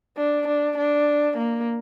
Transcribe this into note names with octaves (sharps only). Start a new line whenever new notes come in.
D4
D4
D4
A#3